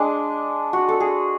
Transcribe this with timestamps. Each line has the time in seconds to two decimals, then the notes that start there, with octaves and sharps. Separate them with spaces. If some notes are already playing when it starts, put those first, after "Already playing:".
Already playing: G#3 D4
0.73 F#4
0.88 A4
1.00 G#4